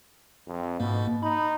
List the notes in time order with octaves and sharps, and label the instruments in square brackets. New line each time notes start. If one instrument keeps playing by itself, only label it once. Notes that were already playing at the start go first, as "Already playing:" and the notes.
[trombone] F2
[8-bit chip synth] G#2 A#3 [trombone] B2
[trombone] D#4 [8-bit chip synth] B5